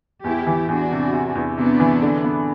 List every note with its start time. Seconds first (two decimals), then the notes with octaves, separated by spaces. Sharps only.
0.24 E2 E4 G4
0.47 E3
0.68 E2 D4 F#4
0.91 C3
1.13 C3
1.35 E2
1.57 C3 B3 D4
1.80 E3
2.03 D3
2.24 B3